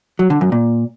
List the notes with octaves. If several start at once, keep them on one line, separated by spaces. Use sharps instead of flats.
F#3
D3
F#2
A#2